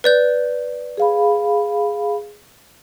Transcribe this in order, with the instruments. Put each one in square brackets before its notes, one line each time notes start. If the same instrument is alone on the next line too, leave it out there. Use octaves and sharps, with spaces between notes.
[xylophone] B4 D5 G6
[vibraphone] G#4 F5 B5